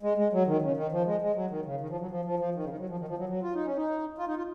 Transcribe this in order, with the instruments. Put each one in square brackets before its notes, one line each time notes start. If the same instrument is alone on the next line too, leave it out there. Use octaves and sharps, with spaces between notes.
[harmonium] G#3
G#3
F#3
D#3
C#3
D#3
F3
G#3
G#3
F#3
D#3
C#3
D#3
F3
F#3
F3
F3
F3
D#3
C#3
D#3
F#3
F3
D#3
F3
F#3
F#3
F4
D#4
C#4
D#4
F4
D#4
F4